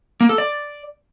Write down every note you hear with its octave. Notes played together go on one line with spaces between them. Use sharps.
A#3
A4
D5